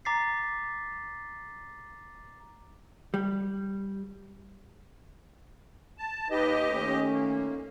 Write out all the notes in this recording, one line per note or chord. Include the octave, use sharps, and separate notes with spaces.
A#5 D6 A6 B6 C7
G3
A5
D#2 D#4 G4 B4 D#5
D#3 A3 C#4
A#2 A#3